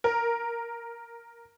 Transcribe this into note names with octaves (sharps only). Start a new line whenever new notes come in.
A#4